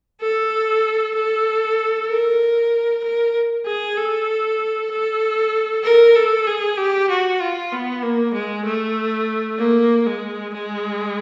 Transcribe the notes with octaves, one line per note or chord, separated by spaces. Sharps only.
A4
A4
A#4
A#4
G#4
A4
A4
A#4
A4
G#4
G4
F#4
F4
B3
A#3
G#3
A3
A#3
G#3
G#3